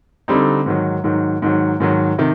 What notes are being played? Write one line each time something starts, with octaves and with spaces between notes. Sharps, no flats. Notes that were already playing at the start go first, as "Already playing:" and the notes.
D3 G3 C4 D#4
G#2 D#3 F#3
G#2 D#3 F#3
G#2 D#3 F#3
G#2 D#3 F#3
C3 D#3